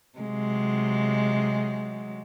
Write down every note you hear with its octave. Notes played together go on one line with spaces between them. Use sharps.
C3 F#3 G#3